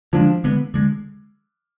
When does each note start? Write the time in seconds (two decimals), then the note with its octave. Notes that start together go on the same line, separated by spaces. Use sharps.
0.13 D3 F3 G#3 D4
0.44 D3 G#3 B3
0.74 D3 G#3